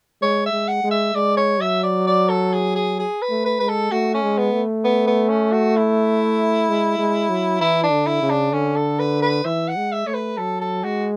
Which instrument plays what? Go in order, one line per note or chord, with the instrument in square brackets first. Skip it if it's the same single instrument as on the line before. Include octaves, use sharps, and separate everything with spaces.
[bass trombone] G#3 [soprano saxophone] C#5
[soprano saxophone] E5
[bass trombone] G#3
[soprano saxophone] F#5
[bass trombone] G#3
[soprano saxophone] E5
[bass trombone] G#3 [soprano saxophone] D5
[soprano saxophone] C#5
[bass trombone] F#3 [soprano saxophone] E5
[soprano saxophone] D5
D5
A4
G#4
G#4
G#4
B4
[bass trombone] A3
[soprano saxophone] B4
[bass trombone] G#3 [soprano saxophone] B4
[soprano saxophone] A4
[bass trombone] A3 [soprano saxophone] F#4
[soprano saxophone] C#4
[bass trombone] G#3
[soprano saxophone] B3
[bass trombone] A3
[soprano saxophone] B3
B3
C#4
F#4
E4
[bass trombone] G#3
G#3
F#3
[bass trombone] E3 [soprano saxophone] E4
[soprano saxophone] D4
[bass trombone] D3
[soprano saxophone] E4
[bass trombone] C#3
[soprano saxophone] D4
[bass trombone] D3 [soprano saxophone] C#4
[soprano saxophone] A4
B4
B4
[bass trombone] E3 [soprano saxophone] E5
[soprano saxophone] F#5
[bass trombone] G#3
[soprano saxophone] E5
[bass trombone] A3 [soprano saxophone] C#5
[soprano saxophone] B4
[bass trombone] F#3 [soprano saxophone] A4
[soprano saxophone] A4
[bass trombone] G#3 [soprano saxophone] F#4